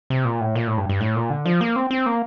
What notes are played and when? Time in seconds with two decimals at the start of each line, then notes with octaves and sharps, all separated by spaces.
0.10 C3
0.25 A#2
0.40 A2
0.55 A#2
0.67 A2
0.78 G2
0.89 G2
1.00 A2
1.16 A#2
1.30 D3
1.45 F3
1.61 A#3
1.76 C4
1.91 C4
2.06 A#3